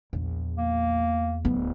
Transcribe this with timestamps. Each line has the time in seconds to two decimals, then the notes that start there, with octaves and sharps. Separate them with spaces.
0.13 A#1 E2
0.58 A#3
1.45 D1 B3